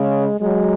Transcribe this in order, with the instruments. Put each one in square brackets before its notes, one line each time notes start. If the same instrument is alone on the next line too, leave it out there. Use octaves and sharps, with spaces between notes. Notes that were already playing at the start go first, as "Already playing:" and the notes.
Already playing: [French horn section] C#3 [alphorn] G#3
[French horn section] F#3 [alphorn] G#3